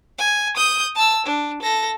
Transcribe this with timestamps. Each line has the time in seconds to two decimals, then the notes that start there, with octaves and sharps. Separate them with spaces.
0.18 G#5
0.57 D#6 G6
0.95 A5 E6
1.26 D4
1.62 A4 A#6